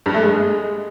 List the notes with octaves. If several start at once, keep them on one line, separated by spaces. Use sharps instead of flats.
G2
A3
G#3